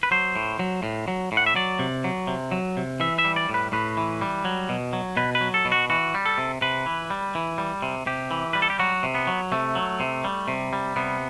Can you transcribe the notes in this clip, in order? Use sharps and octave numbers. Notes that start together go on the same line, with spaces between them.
B4
F#3 C5
A2
F#3
A2
F#3
A2
F#5
E5
F#3 D5
C3
F#3
C3
F#3
C3
E3 E5
E5
G3
D5
A2
B4
A2 B4
E3
G3
F#3
B2
F#3
B2 B4
B4
F#3
A4
B2
F#4
E3 F#4
G3
A4
C3
C3 B4
E3
G3
E3
G3
C3
C3 G4
E3
G3 B4
A4
G4
F#3 F#4
C3
B3
F#3
C3 A3
F#3
C3
G3
C3
G3
C3 B3